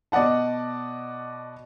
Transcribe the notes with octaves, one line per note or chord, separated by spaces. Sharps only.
B2 D5 D#5 F#5 A5